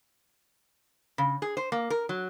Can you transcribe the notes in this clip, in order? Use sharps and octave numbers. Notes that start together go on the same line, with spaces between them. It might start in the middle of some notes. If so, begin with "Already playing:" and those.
C#3
G#4
C5
A#3
A#4
F#3